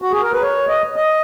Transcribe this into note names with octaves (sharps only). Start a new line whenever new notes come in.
F#4
G#4
A#4
B4
C#5
D#5
D#5